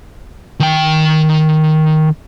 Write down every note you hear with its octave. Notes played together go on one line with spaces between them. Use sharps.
D#3 G5